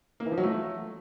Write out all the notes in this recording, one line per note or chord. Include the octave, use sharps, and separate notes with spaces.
A#3
E3
F3
F#3
A3